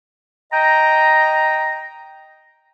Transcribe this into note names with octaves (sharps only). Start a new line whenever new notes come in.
D#5 G5 A#5